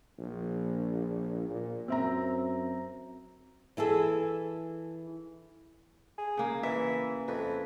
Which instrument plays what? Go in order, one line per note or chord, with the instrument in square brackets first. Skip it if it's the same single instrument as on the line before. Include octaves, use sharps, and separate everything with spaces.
[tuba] A#1
A#2
[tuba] F#2 [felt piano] C4 E5 A#5
[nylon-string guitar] E3 E4 G#4 A4
[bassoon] G#4
[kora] C#3 A#3
[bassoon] E3 [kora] E5
[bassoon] F2 [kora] B4